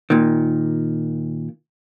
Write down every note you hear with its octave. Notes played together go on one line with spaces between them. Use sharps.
A#2 D#3